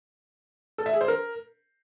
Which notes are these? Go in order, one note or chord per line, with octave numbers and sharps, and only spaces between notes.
A4
E5
G#4
C5
A#4